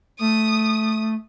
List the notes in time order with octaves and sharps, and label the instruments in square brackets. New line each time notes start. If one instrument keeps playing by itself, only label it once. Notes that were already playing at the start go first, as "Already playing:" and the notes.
[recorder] A3 [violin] D#6